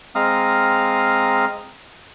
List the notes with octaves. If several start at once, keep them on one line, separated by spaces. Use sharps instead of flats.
G#3 C4 F5 A#5 D#6 F6